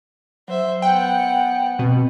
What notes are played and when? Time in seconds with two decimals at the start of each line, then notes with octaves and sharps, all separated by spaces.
0.48 F#3 C5 E5
0.82 B3 F#5 G5
1.79 B2 C4